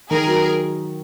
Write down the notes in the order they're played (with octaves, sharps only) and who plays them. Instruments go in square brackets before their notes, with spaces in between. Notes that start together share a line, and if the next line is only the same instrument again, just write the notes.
[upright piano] D#3 [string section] G#4 A#4
[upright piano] F#3